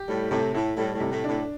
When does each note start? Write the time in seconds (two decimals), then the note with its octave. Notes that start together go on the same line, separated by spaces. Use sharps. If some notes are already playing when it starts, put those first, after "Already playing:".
Already playing: G4
0.08 A2 G3
0.31 A2 C3
0.54 A2 E4
0.77 A2 G3
0.94 A2
1.00 C3
1.11 A2
1.24 A2 D4